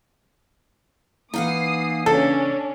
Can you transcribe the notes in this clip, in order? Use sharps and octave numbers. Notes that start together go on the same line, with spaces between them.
E3 A#3 D#4 F5 F#5 D#6 C7
C#3 C#4 D4 A4